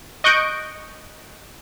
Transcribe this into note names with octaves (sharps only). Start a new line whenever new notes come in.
D#5 C#6 F#6 G6 D7